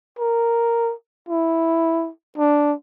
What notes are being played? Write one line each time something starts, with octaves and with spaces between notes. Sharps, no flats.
A#4
E4
D4